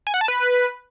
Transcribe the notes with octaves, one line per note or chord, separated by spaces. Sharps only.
G#5
F#5
A5
B4